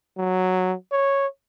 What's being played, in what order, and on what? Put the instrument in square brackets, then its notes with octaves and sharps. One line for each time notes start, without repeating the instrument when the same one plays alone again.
[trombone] F#3
C#5